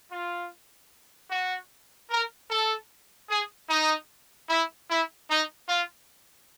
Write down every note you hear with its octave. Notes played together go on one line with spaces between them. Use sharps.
F4
F#4
A#4
A4
G#4
D#4
E4
E4
D#4
F4